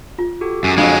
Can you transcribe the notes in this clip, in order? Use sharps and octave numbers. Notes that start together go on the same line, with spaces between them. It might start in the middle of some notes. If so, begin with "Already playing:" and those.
F4
F#4 G4 A4
F#2 F#4 G#5
F2 F#3 G#3 D4